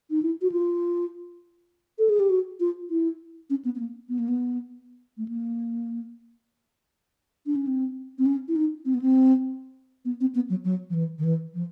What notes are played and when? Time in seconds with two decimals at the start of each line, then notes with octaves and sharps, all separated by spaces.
0.10 D#4
0.22 E4
0.42 F#4
0.52 F4
1.99 A4
2.09 G#4
2.19 G4
2.30 F#4
2.60 F4
2.90 E4
3.50 C#4
3.65 B3
3.75 B3
3.80 A#3
4.09 B3
4.19 A#3
4.28 B3
5.17 A3
5.28 A#3
7.46 D4
7.56 C#4
7.67 C4
8.18 C4
8.26 C#4
8.48 E4
8.56 D#4
8.85 C4
8.94 B3
9.02 C4
10.05 B3
10.21 C4
10.35 B3
10.50 F#3
10.65 F#3
10.90 F3
10.94 E3
11.18 D#3
11.24 E3
11.54 F3